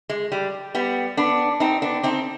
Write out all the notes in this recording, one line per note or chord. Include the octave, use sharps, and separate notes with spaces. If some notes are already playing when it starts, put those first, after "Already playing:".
G#3
G3
G3 B3
B3 D4
C4 D#4
B3 D4
C4 D#4